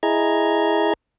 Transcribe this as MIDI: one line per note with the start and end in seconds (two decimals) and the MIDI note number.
0.03 0.94 64
0.03 0.94 68
0.03 0.94 75
0.03 0.94 82
0.03 0.94 92